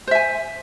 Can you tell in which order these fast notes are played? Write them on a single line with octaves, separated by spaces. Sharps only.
C5 E5 G#5